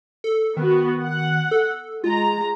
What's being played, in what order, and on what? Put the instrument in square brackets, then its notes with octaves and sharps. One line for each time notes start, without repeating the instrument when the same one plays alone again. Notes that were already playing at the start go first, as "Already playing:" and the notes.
[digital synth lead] A4
[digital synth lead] D#3 [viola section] B3 F#4
[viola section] F#5
[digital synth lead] A4
[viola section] G#3 A#5 [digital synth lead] F4